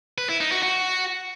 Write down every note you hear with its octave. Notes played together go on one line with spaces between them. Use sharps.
B4
E4
D#4
F#4
F#4